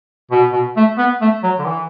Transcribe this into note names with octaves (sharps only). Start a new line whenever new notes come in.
B2
B2
A3
B3
A3
F#3
D3
E3